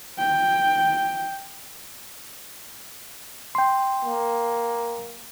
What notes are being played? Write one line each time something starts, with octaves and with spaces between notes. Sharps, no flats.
G5
G5 C6
A#3